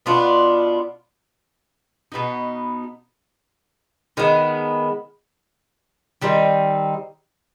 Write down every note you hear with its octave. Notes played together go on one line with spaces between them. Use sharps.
B2 B3 D4 F4
B2 B3 D#4
D#3 G#3 B3
D#3 G3 C4 D#4